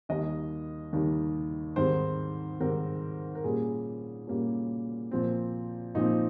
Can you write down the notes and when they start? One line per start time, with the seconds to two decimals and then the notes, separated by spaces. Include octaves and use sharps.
0.09 D#2 D#3 G3 D#5
0.93 D#2 D#3 G3
1.76 G#2 D#3 G3 C4 C5
2.60 G#2 D#3 G3 C4 A#4
3.35 A#4
3.44 A#2 G3 A#3 C#4 G#4
4.27 A#2 G3 A#3 C#4
5.11 A#2 F3 C4
5.95 A#2 F3 C4 D#4